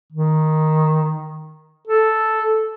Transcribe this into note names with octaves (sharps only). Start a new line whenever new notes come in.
D#3
A4